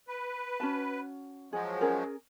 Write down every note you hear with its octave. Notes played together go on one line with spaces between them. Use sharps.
B4
C#4 F#4 A5
F3 F#3 G#3 G#4
C#4 G#4 A#4